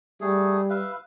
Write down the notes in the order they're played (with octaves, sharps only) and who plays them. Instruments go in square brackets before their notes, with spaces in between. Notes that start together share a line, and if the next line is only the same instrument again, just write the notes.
[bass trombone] G3 [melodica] A3 G#4
[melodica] B4 E5 F5